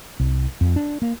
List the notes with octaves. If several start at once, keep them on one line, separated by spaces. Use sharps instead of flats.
C2
F2
D4
A#3